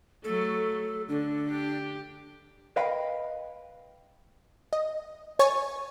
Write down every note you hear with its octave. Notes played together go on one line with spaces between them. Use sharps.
F#3 A3 A4
D3 D4
G4
A#4 B4 D#5 F5 G5 B5
D#5
C#5 G#5 C#6 A6